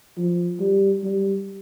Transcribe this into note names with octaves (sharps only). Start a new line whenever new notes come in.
F3
G3
G3